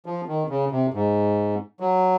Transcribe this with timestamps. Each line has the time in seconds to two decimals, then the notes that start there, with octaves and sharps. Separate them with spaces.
0.06 F3
0.28 D#3
0.50 C#3
0.71 C3
0.94 G#2
1.80 F#3